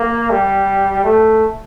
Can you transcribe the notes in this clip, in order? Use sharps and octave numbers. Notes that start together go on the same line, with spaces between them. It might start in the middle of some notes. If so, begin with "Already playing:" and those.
Already playing: A#3
G3
A3